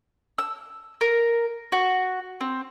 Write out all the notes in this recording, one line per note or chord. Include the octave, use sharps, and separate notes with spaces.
E6
A#4
F#4
C4